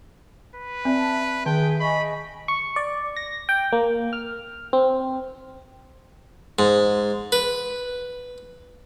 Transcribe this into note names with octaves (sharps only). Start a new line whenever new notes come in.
B4
C4 D5 E5 A5
D#3 G#4 E5 G5 A5
D#5 G#5 B5 C#6
C#6
D5
A#6
G5
A#3
F6
C4
G#2
B4